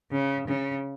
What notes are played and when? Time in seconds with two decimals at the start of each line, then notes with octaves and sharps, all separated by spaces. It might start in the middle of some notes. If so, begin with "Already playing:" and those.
0.12 C#3
0.48 C#3